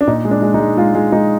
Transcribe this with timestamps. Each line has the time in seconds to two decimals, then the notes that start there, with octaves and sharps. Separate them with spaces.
0.01 D4
0.07 A#2 D#4
0.25 G#3
0.31 D4
0.42 G#3
0.54 D#4
0.60 G#3
0.77 G#3 F4
0.95 G#3
1.12 G#3 D#4